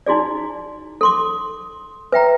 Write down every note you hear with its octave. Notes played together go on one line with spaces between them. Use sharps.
D#4 E4 F#4 G#4 D5
A4 C6 D6
B4 E5 G5 A#5